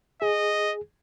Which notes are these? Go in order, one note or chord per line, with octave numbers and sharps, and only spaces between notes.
G#4 D#5